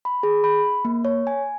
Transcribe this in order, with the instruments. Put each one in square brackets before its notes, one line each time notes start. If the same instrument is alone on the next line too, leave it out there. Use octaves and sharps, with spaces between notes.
[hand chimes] B5
G#4
B5
A#3
C#5
G#5